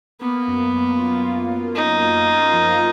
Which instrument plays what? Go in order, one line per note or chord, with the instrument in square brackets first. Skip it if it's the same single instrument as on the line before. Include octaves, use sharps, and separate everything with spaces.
[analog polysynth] A#3 [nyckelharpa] B3
[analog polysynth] F#2
F#2
F4
F4
F4
[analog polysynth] F#2 [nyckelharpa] D#4
[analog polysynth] A#3
F4
F3